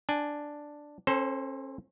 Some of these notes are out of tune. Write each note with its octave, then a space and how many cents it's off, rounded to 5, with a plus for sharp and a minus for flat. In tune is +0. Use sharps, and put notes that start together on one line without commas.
D4 +0 G#5 +15
C#4 -40 A4 +0 C5 +0